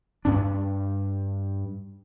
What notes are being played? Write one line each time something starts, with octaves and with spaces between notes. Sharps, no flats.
G2 D4